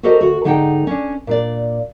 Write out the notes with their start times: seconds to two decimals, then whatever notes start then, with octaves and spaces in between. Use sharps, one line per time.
0.03 F#4 G4 A4 A#4 C5 D#5
0.20 D2 F#4 A4
0.44 G#2 D3 D#4 F#5 G5
0.87 C#4 D4
1.27 A#2 D4 D5